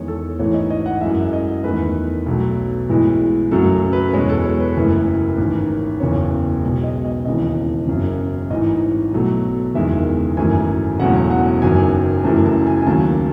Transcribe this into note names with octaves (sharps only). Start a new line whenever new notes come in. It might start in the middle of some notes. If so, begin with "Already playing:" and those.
Already playing: E2 D#3 G#3 C#5
A4
A1 G#2 E3 A3 C#5
D#5
D#5
F#5
F#2 E3 G#3 E5
D#5
E2 D#3 A3 B4
B1 B2 F#3 A3
B1 A2 E3 G#3
F#2 C#3 F#3 A3 A4
A4
B4
E2 B2 G#3 C#5
A4
C#5
B4
F#1 F#2 E3 A3
A1 G#2 D#3
F#1 E2 C#3 C#5
B1 B2 G#3
D#5
D#5
E1 D#2 C#3 E3 D#5
F#1 F#2 C#3
A1 G#2 E3 D#5
B1 B2 F#3 A3
F#1 E2 D#3 G#3 E5
G#1 F#2 E3 A3 G#5
E1 E2 C#3 F#3 A3 F#5
F#5
F#1 F#2 D#3 F#3 G#5
F#1 F#2 E3 A3 A5
A5
G#5
G#5
D#2 C#3 F#3 A3 A5